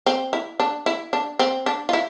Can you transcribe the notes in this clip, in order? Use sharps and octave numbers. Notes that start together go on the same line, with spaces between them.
C4
E4
D4
E4
D4
C4
D4
F4
E4